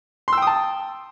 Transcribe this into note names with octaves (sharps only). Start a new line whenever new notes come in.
G5 A5 C6 D#6 E6